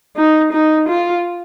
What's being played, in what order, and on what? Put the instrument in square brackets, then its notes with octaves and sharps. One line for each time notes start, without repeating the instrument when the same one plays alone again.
[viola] D#4
D#4
F4